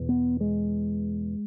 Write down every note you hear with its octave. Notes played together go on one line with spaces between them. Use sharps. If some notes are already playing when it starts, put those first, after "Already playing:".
Already playing: E2 B2
B3
G#3